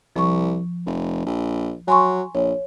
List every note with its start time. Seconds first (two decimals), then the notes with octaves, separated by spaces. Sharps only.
0.16 C2 F3 C#6
0.86 F1
1.26 A#1
1.88 F#3 G#5 C6 C#6
2.35 A#1 C#5